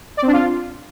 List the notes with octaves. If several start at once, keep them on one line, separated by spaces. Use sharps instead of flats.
D5
C4
D4
F4